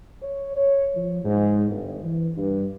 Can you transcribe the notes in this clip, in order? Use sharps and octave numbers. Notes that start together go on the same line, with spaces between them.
C#5
C#5
F3
G#2
G1
E3
G2